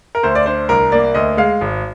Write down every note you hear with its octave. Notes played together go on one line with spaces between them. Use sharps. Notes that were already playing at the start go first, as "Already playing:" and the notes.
A#4
D2 C5
D5
D4 C5
C2 A#4
A#3 D5
D2 D#5
G#3 F5
G#1